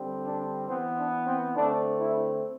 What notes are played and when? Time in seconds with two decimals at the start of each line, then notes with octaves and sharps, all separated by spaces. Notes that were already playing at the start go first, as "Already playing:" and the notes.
Already playing: D3 G3 C4
0.24 D4
0.68 E3 B3 C4
0.97 D4
1.26 C4
1.55 D3 A3 C4 D4
1.99 E4